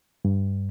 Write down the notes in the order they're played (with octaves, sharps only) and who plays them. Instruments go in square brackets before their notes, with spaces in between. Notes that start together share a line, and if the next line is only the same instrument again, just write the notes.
[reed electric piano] G2